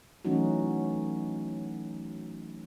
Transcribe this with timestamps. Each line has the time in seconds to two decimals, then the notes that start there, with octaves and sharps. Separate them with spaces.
0.25 E3 F#3 A3 C#4 D#4 F#4